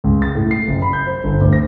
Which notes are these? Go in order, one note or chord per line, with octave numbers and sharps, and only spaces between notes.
C#2
A6
A2
C7
F#1
B5
G6
C5
G1
D2
A#6